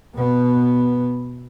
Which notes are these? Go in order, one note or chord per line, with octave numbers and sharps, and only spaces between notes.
B2 B3